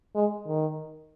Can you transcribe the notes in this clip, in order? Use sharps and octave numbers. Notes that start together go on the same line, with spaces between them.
G#3
D#3